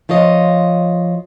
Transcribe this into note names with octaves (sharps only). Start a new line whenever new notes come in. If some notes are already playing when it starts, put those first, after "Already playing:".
F3 F4 C#5 D#5